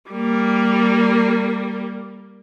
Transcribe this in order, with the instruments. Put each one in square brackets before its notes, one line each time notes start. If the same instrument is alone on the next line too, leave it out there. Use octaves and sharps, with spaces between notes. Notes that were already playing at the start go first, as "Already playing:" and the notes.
[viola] G3 A#3